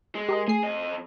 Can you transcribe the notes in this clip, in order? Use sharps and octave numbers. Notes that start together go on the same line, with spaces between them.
G#3
G4 A#4 D#5
A3 G#4 C7
F2 D#5